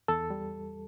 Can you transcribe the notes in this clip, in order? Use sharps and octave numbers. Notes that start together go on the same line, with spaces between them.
E2 A4
G3